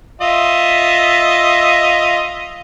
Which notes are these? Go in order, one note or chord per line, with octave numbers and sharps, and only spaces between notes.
F4 D#5 E5